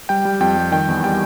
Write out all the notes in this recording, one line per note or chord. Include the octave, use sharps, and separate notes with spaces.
G3 G5
G3
F2 G5
G3
D#3 G5
E2
G3 G5